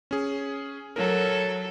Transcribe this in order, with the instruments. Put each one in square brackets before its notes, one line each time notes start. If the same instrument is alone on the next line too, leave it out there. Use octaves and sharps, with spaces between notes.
[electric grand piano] C#4 G#4
[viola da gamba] F#3 A4 [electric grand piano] A#4